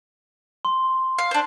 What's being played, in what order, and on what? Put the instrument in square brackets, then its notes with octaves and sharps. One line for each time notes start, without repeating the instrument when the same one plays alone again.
[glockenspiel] C6
[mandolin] F5
D4 C5